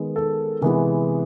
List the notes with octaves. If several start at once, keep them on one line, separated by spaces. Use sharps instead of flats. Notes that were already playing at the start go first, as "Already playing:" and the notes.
Already playing: D#3 G#3 B3
A4
C3 E3 G#3 B3 E4